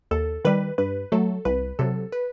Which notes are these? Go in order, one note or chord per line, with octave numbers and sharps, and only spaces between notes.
D#2 A4
D#3 G3 B4
G2 B4
F#3 A3 A4
C2 B4
C3 F#3 A4
B4